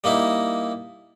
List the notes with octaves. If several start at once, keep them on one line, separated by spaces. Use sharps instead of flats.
G3 A#3 D#4 E4